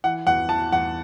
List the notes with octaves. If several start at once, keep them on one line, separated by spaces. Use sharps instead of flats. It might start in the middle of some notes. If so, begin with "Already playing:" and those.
E3 F#5
E2 F#5
E3 A5
E2 F#5